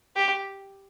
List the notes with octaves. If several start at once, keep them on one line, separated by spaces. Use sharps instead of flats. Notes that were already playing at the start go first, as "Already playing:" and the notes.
G4